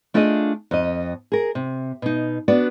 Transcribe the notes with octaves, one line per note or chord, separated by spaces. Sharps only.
A3 D4 E4 F4 G#4 D#5
F2 D#5
G#4 A#4
C3
B2 D#4
B3 D4 F#4 B4 D5